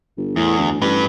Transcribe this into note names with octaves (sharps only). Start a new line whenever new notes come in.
G1
E2 A2
D2
A1 G2 B4